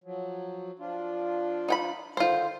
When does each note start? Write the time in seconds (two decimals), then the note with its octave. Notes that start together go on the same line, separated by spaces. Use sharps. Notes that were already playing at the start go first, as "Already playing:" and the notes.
0.04 F3 F#3
0.79 F3 D4 F4
1.68 D#4 G5 B5
2.17 D3 D#3 D#4 F4 C5